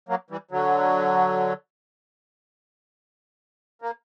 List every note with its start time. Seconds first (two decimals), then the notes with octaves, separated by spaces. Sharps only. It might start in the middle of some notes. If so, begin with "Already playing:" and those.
0.09 F#3 A#3
0.30 E3 G3
0.51 D3 F#3
3.82 A#3